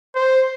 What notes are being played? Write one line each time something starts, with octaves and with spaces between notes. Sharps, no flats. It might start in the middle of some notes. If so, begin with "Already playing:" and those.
C5